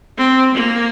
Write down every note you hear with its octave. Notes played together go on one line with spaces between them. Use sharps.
C4
A#3